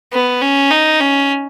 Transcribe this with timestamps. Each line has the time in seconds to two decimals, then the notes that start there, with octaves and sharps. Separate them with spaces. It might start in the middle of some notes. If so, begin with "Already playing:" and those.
0.13 B3
0.42 C#4
0.71 D#4
1.00 C#4